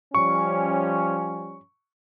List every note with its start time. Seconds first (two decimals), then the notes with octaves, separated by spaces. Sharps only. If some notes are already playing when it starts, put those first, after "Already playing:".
0.15 F3 G3 C#4 C#6